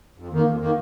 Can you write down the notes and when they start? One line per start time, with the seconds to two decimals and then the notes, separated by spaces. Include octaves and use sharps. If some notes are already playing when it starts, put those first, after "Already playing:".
0.18 F2
0.32 D#3 A#3
0.46 F2
0.61 D#3 A#3